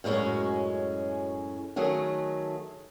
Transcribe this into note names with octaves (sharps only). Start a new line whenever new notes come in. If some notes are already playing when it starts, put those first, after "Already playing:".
F#2 A2 G#3 C#4 F#4
D#3 F#3 A3 G#4